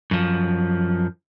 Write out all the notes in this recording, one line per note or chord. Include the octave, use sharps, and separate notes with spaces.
F#2 F3